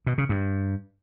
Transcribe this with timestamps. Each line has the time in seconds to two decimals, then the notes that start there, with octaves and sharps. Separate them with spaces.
0.06 B2
0.18 C#3
0.29 G2